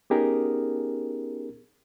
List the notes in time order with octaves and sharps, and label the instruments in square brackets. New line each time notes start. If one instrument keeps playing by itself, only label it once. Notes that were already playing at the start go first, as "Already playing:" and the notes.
[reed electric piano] B3 C#4 D#4 G4 G#4 A#4